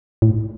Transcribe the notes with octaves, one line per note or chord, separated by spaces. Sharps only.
A2